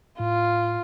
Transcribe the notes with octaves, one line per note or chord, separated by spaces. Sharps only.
A2 F4